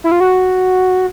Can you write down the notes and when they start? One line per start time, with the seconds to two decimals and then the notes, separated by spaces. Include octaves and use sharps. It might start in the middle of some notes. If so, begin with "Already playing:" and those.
0.04 E4
0.12 F4
0.20 F#4